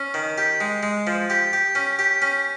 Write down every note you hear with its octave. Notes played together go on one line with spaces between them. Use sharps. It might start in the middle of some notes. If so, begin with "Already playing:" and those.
Already playing: C#4
D#3
G4
G#3
G#3
F3
G4
G4
C#4
G4
C#4